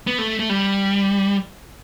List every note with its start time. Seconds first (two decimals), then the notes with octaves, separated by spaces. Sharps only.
0.07 B3
0.19 A3
0.40 A3
0.50 G3